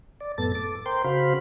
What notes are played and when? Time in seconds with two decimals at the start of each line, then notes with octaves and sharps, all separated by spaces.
0.21 D5
0.38 F#2 A2 B3 A4 A6
0.55 A4 D6
0.86 A#4 C5 G5 C6
1.04 C#3 F#4 C5 F5 B5